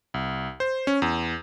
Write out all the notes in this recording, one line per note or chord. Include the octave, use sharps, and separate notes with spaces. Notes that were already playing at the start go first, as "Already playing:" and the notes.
C2
C5
C#4
E2